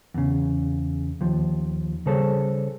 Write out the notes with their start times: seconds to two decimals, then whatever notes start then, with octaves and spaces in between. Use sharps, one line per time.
0.14 E2 C#3
1.21 D#2 F3
2.06 C#3 G3 G#4 A4 C5 C#5